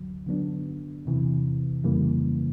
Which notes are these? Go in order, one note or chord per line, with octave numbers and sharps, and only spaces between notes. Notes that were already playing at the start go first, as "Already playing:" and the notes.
Already playing: D2 D3 F#3
D3 F#3 B3 D4
E2 C3 E3
F2 C#3 E3 G3 A#3